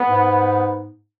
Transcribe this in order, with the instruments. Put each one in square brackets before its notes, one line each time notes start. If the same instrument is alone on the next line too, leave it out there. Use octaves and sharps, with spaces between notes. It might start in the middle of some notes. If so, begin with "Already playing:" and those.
Already playing: [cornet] B3
[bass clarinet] G#2